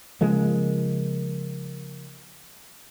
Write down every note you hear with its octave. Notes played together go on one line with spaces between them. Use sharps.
C#3 F3 G#3 A#3